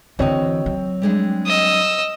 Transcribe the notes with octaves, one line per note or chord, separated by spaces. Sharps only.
D3 E3 C4 F#4 C#5 D#5 G5
F#3
G3 G#3 D4
D#5 E6